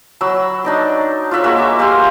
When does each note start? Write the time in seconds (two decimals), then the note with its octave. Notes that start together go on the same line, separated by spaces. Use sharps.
0.21 F#3 B5 E6
0.64 D4 D#4 D5
1.31 F4 C#5 E5 F#5
1.44 G#3 A#3 F#4 E5
1.57 E5 D6
1.79 G4 F5 G#5 C6